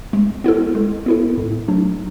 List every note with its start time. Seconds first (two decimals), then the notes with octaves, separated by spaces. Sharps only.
0.13 G#3
0.44 B3 E4 A4
0.75 G#3
1.06 B3 E4 A4
1.38 A2
1.68 F#3 A3 D4